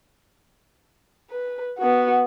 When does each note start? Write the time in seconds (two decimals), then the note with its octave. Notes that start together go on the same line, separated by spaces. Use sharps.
1.31 B4
1.79 B3 F#4